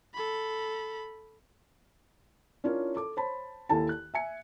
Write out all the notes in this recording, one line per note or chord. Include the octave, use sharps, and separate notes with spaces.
A4 B5
C#4 D4 E4 F4 A#4 C#5
A4 D6
C5 C#5 A5 B5
D#2 E4 A4 G#5 A5
F#6
E5 G#5 C#7